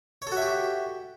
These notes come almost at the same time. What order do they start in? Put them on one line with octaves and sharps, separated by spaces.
C#5 A4 F#4 E5 G4